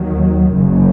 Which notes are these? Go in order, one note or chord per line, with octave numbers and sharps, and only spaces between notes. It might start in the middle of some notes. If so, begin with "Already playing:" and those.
Already playing: D#2 D#3 F#3
F#1 F#2 C#3